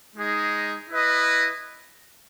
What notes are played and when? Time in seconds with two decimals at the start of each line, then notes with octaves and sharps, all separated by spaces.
0.15 G#3 D#4 G#4
0.90 E4 B4 D#5